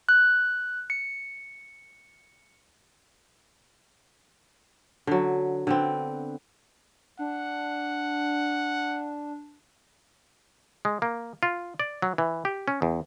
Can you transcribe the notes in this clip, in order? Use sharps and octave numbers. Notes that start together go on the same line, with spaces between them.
F#6
C#7
D3 F#3
D3 B3 C4
D4 F#5
G#3
A#3
F4
D5
F#3
E3
G4
C#4
E2